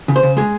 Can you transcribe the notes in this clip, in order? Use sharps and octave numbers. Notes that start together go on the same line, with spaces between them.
C#3
C5
C#3
G#3 G#4